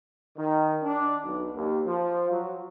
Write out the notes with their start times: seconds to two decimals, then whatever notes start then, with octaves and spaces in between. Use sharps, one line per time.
0.37 D#3
0.83 D4
1.24 B1
1.55 D#2
1.86 F3
2.30 F#3